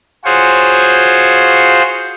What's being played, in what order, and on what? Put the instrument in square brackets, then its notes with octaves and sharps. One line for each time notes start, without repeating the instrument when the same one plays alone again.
[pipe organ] F4 F#4 G#4 C5 C#5